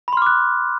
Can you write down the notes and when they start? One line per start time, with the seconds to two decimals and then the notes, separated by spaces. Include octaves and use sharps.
0.08 B5
0.13 C6
0.17 F6
0.22 D6
0.27 F#6